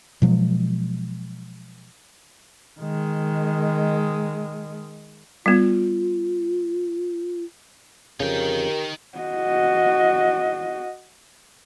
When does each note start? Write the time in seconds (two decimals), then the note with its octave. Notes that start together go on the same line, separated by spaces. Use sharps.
0.22 B2 F3 F#3 G#3
2.80 D#3 G#3
5.46 G3 B3 F4
8.20 F2 C#3 D#4 G4 A#4 G5
9.18 F#4 D#5